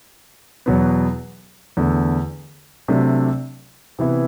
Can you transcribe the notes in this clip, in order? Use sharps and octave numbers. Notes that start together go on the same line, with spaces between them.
E2 B2 F#3 B3
E2 D3 A3
C3 F#3 A3 D4
C3 E3 B3 E4